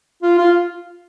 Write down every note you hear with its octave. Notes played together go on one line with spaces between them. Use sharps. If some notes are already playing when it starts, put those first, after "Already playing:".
F4
F4